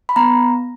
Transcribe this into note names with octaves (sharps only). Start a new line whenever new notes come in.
B5
B3 A#5